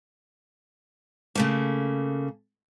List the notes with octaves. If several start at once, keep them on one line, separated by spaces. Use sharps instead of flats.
C#3 A3 A#3